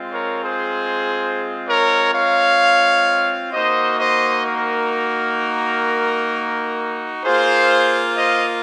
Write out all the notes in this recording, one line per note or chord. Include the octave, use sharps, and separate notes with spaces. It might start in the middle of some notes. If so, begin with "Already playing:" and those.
Already playing: G#3 C4 F4
A#4 C#5
G#4 C5
A#4 C#5
C#5 F5
A#3 D#4 F#4 C5 D#5
C5 D#5
A#4
A#3 F4 G#4 C5
C5 D#5